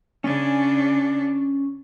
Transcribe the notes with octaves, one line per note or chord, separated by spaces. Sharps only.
C#3 C#4 D4 G#5